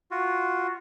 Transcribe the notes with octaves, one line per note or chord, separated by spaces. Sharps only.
F4 F#4